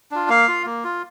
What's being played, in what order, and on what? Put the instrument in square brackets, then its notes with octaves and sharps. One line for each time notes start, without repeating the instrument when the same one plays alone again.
[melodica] D4 F4
A#3 F5
F4
A#3
F4